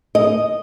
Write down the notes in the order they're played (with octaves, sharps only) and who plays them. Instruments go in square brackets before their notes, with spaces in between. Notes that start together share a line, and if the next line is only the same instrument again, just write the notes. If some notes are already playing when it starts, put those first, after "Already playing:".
[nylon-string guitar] D#5